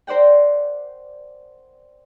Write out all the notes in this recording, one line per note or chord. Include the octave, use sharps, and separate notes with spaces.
A#4 C5 D5 F#5 G5